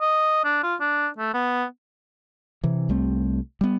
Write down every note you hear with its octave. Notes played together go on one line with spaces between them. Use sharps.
D#5
D4
F4
D4
A3
B3
C3 E3
C2 G3 A3 C4
G3 B3